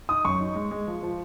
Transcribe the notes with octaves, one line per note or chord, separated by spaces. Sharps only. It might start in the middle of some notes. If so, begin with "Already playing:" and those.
D#4 D#6
F#2 C#6
D#4
G#3
G#3
F3
F3